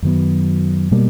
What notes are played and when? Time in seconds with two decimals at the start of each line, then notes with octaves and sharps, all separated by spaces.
0.02 F#2 D#3 F#3 B3
0.92 B2 G3 A#3